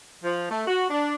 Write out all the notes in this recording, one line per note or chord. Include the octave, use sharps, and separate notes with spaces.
F3
A3
F#4
D4